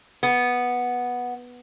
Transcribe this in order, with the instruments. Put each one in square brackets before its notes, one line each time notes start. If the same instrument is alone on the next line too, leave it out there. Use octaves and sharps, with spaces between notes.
[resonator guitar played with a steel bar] B3